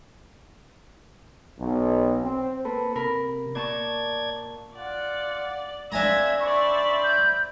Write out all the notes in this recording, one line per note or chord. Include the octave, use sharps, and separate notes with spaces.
B1
C4
A#3 A4 B4
C3 A#4 B5
A#2 D5 A5 C#6 G#6
F4 D5 F#5
A#3 C4 D4 E5 G#5 A#5 G#6
C5 D5 E5 B5 C#6
G6